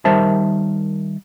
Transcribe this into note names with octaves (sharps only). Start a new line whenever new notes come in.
D#3 G3 A#4 C5 E5 A5